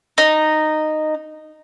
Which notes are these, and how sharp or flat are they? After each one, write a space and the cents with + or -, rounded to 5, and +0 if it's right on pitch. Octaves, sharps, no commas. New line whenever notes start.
D#4 -10